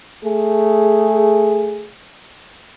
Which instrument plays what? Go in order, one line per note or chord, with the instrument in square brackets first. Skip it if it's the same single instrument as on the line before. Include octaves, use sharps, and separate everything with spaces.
[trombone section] A3 G#4